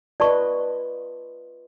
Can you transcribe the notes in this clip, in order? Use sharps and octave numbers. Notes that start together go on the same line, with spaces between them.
F4 B4 D5 D#5 A5 C#6